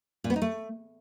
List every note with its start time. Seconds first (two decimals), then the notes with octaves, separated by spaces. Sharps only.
0.24 A#2
0.30 B3
0.36 D#4
0.42 A3